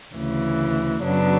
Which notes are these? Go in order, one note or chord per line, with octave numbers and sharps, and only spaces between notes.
D2 C#3 E3
F#2 C#3 F#3 B3 D4